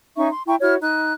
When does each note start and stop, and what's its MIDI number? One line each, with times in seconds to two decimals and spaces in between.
0.17 0.29 61
0.17 0.29 63
0.17 0.29 76
0.17 0.29 85
0.30 0.43 84
0.47 0.56 64
0.47 0.56 79
0.47 0.56 82
0.47 0.56 85
0.61 0.76 64
0.61 0.76 66
0.61 0.76 73
0.61 0.76 89
0.81 1.14 63
0.81 1.14 90